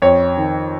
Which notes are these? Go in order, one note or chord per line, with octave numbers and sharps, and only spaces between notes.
F2 C#5
D#3